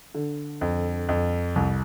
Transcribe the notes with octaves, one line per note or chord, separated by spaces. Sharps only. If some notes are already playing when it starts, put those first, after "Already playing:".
D3
F2
F2
C2